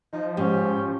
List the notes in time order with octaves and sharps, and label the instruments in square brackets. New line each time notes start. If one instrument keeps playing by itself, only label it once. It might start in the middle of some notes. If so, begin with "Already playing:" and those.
[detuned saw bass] F3 [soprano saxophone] D#4
[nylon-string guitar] G#2 [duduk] C#4 [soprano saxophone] G4